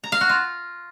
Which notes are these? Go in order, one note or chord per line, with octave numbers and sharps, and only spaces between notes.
A#5
F5
F#4
F4